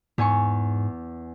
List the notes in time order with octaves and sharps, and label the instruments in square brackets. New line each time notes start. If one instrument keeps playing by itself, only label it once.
[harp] E2 G#5 C#6 [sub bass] G#2